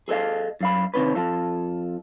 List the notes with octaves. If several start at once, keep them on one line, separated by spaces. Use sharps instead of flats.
G#4 A4 B4 D#5 F5
F#2 F5 B5
C3 D#3 C4 C#4 B4
F2 F4 A4